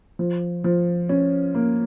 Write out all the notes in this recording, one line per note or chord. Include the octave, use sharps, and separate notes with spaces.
F3
F3
C#4
A#3